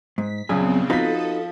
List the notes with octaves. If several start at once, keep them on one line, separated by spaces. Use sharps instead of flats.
G#2 B6
A#1 F#2 C#3 B3 C4 G#4
F3 D#4 F#4 A4 B4 D#6 B6